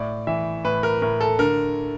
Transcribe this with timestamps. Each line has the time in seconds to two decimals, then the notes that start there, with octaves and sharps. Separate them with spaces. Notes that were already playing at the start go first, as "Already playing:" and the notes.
Already playing: A2 D5
0.27 E3 E5
0.65 A2 B4
0.83 A#4
1.02 A2 A#4
1.21 A4
1.39 D3 A#4